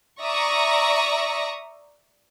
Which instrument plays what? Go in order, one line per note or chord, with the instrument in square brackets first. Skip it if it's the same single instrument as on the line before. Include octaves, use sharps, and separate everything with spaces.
[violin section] D5 E5 A#5 C#6 D#6 A#6